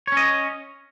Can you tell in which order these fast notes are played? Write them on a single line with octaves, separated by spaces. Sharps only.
C#5 C#4 D#5